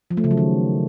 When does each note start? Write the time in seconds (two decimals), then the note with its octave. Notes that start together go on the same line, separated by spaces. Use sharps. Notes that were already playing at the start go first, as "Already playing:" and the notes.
0.11 F3
0.17 A3
0.24 C#3
0.31 F#3
0.37 D#3